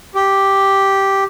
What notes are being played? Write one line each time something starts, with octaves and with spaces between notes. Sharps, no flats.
G4